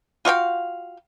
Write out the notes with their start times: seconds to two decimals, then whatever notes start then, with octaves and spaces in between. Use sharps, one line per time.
0.25 F4 F#4 F5 G5